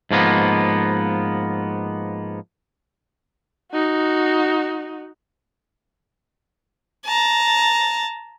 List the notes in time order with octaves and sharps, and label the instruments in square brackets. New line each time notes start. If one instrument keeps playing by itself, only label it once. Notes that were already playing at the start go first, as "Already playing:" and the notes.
[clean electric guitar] G#2 F3 A#3 B3
[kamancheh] D#4 F#4
[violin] A5 A#5